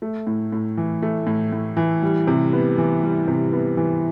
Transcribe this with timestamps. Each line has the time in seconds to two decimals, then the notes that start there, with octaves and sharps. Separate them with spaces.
0.02 A3
0.27 A2
0.52 A2
0.77 E3
1.02 A3
1.27 A2
1.53 A2
1.77 E3
2.03 G3
2.27 C3
2.53 B3
2.78 E3
3.03 G3
3.28 C3
3.53 B3
3.77 E3